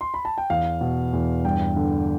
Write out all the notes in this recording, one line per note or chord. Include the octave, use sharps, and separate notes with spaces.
C6
B5
A5
G5
E2 F5
B2
E2
G2 G5
D3